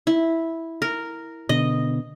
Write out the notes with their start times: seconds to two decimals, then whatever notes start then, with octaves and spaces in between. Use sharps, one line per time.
0.07 E4
0.82 A#4
1.49 B2 D3 D#5